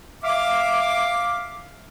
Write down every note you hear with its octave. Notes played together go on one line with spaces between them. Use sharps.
E5 F5 D6